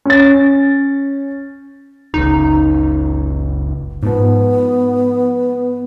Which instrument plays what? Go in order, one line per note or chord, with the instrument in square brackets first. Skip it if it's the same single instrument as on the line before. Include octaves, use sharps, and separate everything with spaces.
[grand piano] C#4 A6
[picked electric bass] F#1 C#2 [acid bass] D#4
[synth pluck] G#2 F3 [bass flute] B3